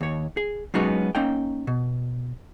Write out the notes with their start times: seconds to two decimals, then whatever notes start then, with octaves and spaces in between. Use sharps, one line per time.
0.01 D#2 C#5
0.37 G#4
0.74 F#3 G#3 B3 C#4 D#4 F#4
1.15 A#3 C#4 D#4 G5
1.67 B2